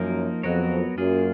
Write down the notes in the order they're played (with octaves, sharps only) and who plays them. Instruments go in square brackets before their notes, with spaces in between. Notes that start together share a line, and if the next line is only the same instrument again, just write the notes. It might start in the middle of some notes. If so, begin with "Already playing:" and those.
Already playing: [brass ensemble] F#2 [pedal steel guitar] F3 A#3 D#4 A#4
[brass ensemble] F2 [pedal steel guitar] F#3 B3 F#4 A#4 C#5
[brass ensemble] F#2 [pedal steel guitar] A#3 F4 G#4